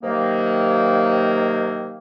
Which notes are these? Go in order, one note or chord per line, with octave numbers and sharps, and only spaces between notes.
C3 D#3 F#3 A#3